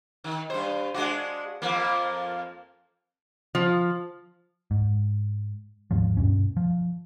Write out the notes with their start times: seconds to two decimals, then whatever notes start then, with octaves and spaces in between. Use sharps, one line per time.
0.24 D#3
0.50 G2 C#3 C5
0.94 G#3 D4 F#4
1.62 F2 F3 A#3
3.55 F3
4.71 G#2
5.91 D#2 G#2 F3
6.17 G2 B2 C#4
6.57 F3